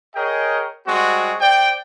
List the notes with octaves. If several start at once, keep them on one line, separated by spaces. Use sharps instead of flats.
G#4 A#4 C#5 D#5 G5
G3 G#3 C4 F#4
C5 D5 G5